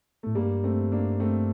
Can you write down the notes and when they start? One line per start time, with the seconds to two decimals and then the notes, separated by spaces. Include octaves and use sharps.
0.23 A2 A3
0.35 G2 G3 A#3
0.64 A3 C4
0.92 A#3 D4
1.20 A3 C4